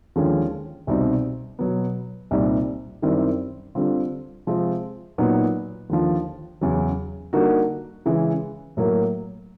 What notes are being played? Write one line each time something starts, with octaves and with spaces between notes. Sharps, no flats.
D#2 D3 F3 G#3 C#4
C2 B2 G3 C4 D#4
B2 F#3 B3
C2 A#2 G3 C4 D#4
F#2 D#3 G3 C4 E4
D3 G3 C4 F4
C3 F3 G#3 C4
A#2 F#3 B3 D#4 F#4
D#2 D3 F3
E2 C#3 F#3
D3 G3 A#3 D#4 F#4
C#3 E3 G#3
A2 F#3 A#3